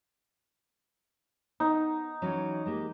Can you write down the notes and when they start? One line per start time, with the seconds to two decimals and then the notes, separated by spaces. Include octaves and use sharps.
1.60 B3 D#4
2.22 E3 F#3 C#4
2.66 G#3 A#3 G4